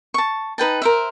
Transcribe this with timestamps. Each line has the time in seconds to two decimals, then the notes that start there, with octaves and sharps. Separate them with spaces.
0.14 A5 C#6
0.58 D#4 B4 G5 A5
0.82 A#4 C5 E5